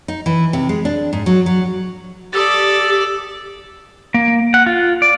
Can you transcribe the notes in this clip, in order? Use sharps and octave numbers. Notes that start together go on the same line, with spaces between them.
D#4
E3
C3
G#3
D4
G#2
F#3
F#3
G4 A4 D5 D#6 E6 A6
A#3
F#5
F4
D5